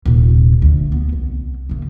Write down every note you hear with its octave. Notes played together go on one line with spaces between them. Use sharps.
D#1 C3
D2
B3
C2
D#2 C#3